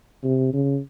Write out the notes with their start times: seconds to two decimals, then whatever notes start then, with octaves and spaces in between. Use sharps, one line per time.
0.24 C3
0.54 C#3